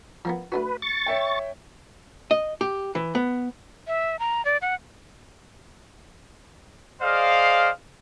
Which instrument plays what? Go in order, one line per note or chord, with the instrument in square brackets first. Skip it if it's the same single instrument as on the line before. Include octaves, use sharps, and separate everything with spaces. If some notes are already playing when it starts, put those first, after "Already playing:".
[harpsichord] F3 A#3 B3
[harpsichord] A3 D4 F#4 [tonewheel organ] B4
[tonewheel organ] C#6 A6
[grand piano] C#5 E5 G5
[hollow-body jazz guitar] D#5
G4
E3
B3
[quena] E5
A#5
D5
F#5
[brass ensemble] G#4 C5 D5 D#5 F5